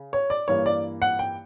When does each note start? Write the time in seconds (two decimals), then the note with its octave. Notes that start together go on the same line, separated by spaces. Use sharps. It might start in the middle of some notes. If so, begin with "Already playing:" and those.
Already playing: C#3
0.13 C#5
0.30 D5
0.48 G2 E3 A#3 C#5
0.66 D5
1.02 F#5
1.19 G5